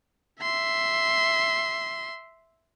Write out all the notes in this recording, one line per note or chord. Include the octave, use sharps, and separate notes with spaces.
E5 C6